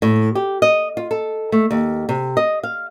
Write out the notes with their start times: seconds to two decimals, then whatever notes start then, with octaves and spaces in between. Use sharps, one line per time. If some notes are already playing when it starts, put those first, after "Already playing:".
0.02 A2
0.35 G4
0.62 D#5
0.97 F4
1.11 A4
1.52 A3
1.71 D#2
2.09 C3
2.37 D#5
2.63 F5